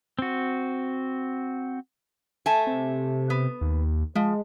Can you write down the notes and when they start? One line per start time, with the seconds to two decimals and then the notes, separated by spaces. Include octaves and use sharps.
0.19 C4 F#4
2.46 A3 G#5 A5
2.67 C3
3.30 B3
3.61 D#2
4.15 F3 G#3